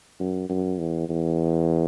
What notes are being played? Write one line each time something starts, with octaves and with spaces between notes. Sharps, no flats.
F#2
F#2
E2
E2